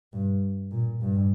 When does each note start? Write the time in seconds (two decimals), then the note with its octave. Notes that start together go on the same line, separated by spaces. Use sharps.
0.13 G2
0.71 A#2
1.01 G2